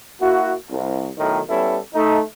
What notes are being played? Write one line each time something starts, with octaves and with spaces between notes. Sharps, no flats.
A#3 E4 F#4
C2
B1 A2 D#3
G3 B3 C#4 E4 A4
A3 D#4